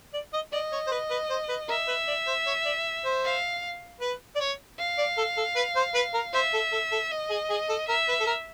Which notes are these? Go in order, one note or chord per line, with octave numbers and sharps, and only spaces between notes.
D5
D#5
D5 D#5
C#5
C5
B4
B4
C5
B4
A#4 E5
B4
D5
C5
C#5
D5
C5
F5
B4
D5
C#5
F5
D5
A4
A4
B4
C5
B4
A#4
C5 E5
A4
A4
A4
D#5
G#4
G#4
A4
A#4 E5
B4
A4
A#4